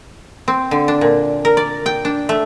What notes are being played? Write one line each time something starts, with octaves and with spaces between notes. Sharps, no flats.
C4
D3
D4
A#2
A#4
D5
G5
D4
A3